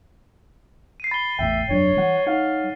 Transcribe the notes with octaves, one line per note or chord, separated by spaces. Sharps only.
C7 D#7
B5 A6 G7
A1 E2 A2 E5 G5
F1 G2 F#3 D4 C#5
E3 G3 F#5
D#4 C#5 F5 F#5